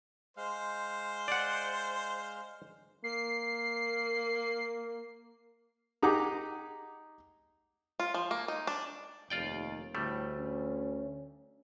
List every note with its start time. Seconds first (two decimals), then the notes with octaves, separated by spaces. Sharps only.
0.37 G#3 C5 F5
1.28 D5 F#5
3.04 A#3 C7
6.03 D#4 G4 G#4 F#5 A#5 D6
8.00 F4
8.14 F3
8.31 A#3
8.48 D#4
8.67 D4
9.30 F1 D#2 F4 D5 G5
9.95 D2 A2 G3 A3
10.39 C#4